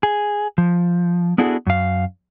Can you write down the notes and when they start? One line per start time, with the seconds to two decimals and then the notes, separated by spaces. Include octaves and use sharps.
0.03 G#4
0.58 F3
1.38 B3 D4 E4 F#4 G#4 A4
1.67 F#2 F5